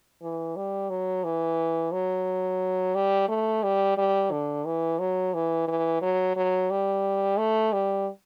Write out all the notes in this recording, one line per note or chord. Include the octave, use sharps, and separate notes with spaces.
E3
G3
F#3
E3
F#3
G3
A3
G3
G3
D3
E3
F#3
E3
E3
F#3
F#3
G3
A3
G3